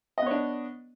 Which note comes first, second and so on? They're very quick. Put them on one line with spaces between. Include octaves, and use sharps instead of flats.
D#5 B3 C#5 D4